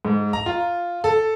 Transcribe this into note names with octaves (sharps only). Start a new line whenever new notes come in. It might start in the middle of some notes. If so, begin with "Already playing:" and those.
G#2
A#5
F4
A4